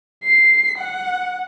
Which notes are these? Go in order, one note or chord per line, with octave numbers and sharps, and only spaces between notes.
C7
F#5